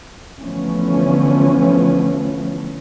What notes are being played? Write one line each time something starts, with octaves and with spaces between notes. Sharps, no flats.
D3 E3 F3 A3 B3 C#4